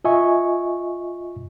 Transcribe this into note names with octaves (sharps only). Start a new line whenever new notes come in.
F4 D#5 E5 G#5 C#6